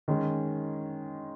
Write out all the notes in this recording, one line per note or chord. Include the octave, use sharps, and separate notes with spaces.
D#3 G#3 C#4